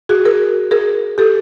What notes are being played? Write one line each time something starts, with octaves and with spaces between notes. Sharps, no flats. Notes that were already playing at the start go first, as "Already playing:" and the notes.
F#4 G#4
G#4 A#4
G#4 A#4
G4 A4